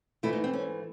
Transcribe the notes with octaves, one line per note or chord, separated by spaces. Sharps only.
G#2 E3 A3 E4
D#4
C4
C#4